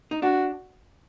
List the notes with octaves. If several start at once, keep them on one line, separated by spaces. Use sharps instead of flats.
D#4
D4 F#4